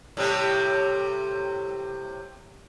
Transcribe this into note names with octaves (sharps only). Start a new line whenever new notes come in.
A2 C3 G3